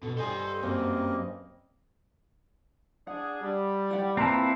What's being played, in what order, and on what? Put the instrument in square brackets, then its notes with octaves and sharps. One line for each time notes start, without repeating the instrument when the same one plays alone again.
[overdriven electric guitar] B2 [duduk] A4
[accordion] G2 G3 D#5 [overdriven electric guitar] A4 G#5 [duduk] C5
[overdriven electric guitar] F#2 [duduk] A#3 [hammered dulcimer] C4
[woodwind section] D4 G#4 [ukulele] F#5
[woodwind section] G3
[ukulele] D5 F#5 G5
[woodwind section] A#2 A#3 B4 [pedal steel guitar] C4 E4 [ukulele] A5 A#5